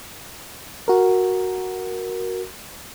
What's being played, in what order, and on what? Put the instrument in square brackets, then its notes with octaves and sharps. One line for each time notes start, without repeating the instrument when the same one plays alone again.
[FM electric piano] F#4 A#4